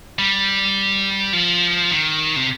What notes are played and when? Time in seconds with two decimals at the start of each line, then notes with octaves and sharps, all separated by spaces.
0.19 G3
1.33 F3
1.91 D#3
2.36 C3